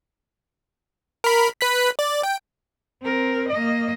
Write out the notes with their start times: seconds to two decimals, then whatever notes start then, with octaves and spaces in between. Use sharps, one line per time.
1.24 A#4 B5
1.61 B4 F#6 B6
1.99 D5
2.23 G5
3.02 C4 A#4
3.49 A#3 D#5